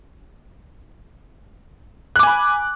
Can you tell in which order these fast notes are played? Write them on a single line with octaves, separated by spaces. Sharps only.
F#6 D6 G#5 B5